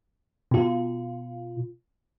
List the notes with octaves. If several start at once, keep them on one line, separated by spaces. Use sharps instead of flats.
B2 F4